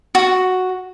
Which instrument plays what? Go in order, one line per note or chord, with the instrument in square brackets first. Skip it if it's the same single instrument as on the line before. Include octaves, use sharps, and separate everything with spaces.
[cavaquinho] F#4